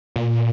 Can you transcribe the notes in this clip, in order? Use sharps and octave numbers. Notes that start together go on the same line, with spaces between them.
A#2